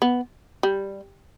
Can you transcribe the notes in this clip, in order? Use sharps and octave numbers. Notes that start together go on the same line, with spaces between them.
B3
G3